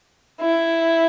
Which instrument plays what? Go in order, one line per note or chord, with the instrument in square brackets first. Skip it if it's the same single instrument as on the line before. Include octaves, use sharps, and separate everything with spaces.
[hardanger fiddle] E4